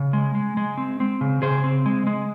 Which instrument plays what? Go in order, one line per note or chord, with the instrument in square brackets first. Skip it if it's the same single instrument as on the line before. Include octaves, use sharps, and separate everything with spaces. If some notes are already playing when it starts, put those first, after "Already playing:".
Already playing: [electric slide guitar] C#3
G#3
G#3
G#3
C4
C4
C#3
C#3 G#4 C5
C4
G#3
G#3